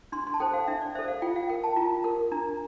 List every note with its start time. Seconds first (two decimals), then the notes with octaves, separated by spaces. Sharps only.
0.12 D4 C6
0.27 C6
0.34 A5
0.40 A4 C5 G5
0.54 F5
0.68 D4 E5
0.81 D5
0.95 A4 C5 E5
1.08 F5
1.22 F4 G5
1.36 F5
1.50 A#4 G5
1.63 A5
1.76 F4 A#5
2.04 A#4
2.32 D4 A#5